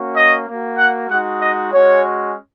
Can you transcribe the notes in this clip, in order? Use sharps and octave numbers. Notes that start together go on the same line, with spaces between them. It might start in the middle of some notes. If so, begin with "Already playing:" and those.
Already playing: A#3 C#4 F#4
D#5
A#3 F#4
F#5
G#3 D#4 F#4 F#5
D#5
G#3 C#4 F#4 C#5